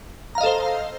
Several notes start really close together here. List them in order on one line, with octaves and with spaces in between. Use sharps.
A#5 F5 D#5 A4 C5